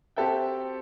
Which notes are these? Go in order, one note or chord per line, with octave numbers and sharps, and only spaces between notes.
C4 F#4 G4 A4 E5 G5